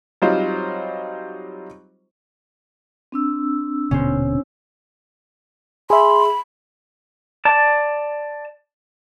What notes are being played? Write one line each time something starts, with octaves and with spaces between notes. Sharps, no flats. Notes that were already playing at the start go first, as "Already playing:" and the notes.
F#3 G3 C4 D#4 F4 C5
C4 D4 E6
D#1 B2 D3 C#4 C5
G#4 E5 B5 C6
D5 A5